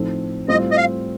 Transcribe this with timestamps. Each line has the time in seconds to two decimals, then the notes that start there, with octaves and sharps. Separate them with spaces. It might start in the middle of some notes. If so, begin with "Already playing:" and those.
Already playing: A2 F3 C4 D#4 A4
0.48 A2 G3 C4 F4 D#5
0.71 D#5
0.77 F5